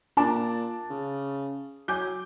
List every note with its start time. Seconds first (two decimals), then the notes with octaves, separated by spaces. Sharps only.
0.17 A#2 D4 A5 D6
0.90 C#3
1.88 F#3 G#5 D6 G6